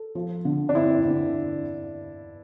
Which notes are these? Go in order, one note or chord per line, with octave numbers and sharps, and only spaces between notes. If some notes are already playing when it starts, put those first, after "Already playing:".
Already playing: A4
F3
D3
D4
C4 E4
D3